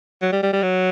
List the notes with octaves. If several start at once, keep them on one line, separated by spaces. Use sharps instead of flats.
F#3
G3
G3
G3
F#3